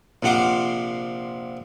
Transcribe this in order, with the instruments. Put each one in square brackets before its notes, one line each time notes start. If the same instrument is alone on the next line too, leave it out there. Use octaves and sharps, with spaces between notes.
[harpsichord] A#1 C3 F3 F#5 C6 D6